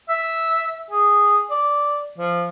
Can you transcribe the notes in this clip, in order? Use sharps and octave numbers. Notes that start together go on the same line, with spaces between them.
E5
G#4
D5
F3